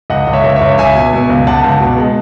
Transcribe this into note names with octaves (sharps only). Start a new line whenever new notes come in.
C#2 D#5 F#5
C#2
C#5 E5
C#2
C#5 E5
C#2
C#2 E5 G#5
B2
B2
C#2
C#2 F#5 A5
C#2
B2
G#3